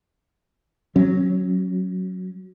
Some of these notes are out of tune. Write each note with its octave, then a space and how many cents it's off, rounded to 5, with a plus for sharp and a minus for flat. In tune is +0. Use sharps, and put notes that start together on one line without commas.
F#3 +0 C#4 -20